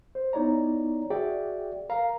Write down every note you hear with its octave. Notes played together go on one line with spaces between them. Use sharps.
C5
B3 D#4 E4 C#5 D5 A#5
F#4 G#4 D5 E5 G5
A#4 F5 A#5